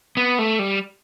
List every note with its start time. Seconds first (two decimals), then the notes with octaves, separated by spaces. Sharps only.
0.17 B3
0.39 A3
0.59 G3